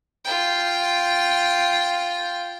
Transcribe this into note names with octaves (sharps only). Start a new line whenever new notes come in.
F4 G5